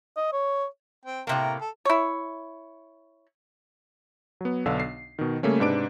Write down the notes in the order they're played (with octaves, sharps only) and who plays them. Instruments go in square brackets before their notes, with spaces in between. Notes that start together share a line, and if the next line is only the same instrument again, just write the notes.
[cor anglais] D#5
C#5
[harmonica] C4 G5
[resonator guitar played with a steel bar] A2 C3 A#3 [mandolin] E5 G5 A5 [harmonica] A#5
[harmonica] A4
[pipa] E4 C#5
[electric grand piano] F#3 B3
B1 D3 B3 D4 F5 E6
C7
B2 D#3
C#3 G3 A3 A#3 C#4
G#2 C3 D4 B4 D6 D7